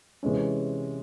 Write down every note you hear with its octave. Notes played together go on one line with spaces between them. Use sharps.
C3 E3 G#3 C#4